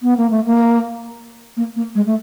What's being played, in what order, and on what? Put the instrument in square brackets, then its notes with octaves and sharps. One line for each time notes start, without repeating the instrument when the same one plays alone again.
[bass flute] B3
A#3
A3
A#3
A#3
A#3
G#3
A3